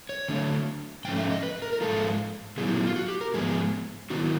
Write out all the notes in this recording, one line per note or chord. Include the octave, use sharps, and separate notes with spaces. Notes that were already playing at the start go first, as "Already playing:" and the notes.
C#5
D3 F#3 A3 D4
G#2 F3 A3 C#4 G5
E5
D#5
B4
A#4
A#4
G#2 F3 G#3 F4 A4
A#2 F#3 B3 E4 G#4
G4
F#4
F4
F#4
G4
A#4
G#2 F3 G#3 B3 G#4
D#3 F#3 B3 E4 F#4